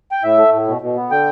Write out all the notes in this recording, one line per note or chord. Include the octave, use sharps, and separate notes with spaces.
G5
A2 E5
A3
A2
B2
B2
B3
D3 G5